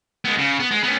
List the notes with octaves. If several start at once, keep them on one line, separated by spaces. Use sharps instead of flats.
G#3 B3
C#3
B3
G#3
B3 C#4